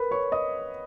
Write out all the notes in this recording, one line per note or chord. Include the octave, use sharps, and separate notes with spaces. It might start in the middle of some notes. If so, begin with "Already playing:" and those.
Already playing: A#4 B4 B5
C#5 C#6
D#5 D#6